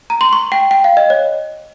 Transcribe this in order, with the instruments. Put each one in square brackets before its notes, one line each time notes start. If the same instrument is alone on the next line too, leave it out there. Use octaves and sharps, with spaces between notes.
[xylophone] A#5
C6
C#6
G5
G5
F5
D#5
C#5